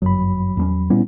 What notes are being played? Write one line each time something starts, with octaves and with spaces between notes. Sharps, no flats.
G1 F#2 F#3 B5
E2 A#3 C#4
A#2 G3 B3 C#4 E4